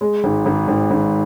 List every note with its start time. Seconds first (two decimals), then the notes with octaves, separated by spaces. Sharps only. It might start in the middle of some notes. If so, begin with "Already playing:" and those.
0.01 G#3
0.24 G#1
0.46 G#1
0.68 G#1
0.91 G#1